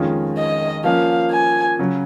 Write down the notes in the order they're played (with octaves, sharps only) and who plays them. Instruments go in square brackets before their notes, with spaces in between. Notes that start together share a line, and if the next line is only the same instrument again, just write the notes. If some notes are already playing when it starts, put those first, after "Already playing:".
Already playing: [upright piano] F2 D#3 G#3 C#4 F4
[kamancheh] D#5
[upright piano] F3 A#3 C#4 [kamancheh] F5
[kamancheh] G#5
[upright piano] C#3 F#3 C#4